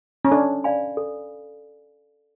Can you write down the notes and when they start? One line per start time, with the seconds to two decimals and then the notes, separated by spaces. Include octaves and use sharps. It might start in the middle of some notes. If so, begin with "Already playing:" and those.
0.25 C#4
0.31 D4 A4
0.64 D5 F5 G#5 B5
0.97 A4